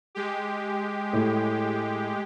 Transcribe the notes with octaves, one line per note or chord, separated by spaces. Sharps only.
G#3 G4
A2